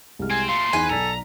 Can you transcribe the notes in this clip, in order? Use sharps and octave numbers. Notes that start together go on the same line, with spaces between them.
C2 G#3 F6
C4 G#5
A#2 A3 F5 C6
E2 D#4 B4 G#5
B1 A4 D5 A#5 B6